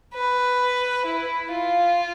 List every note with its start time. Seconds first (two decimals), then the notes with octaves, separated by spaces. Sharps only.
0.14 B4
1.05 E4
1.51 F4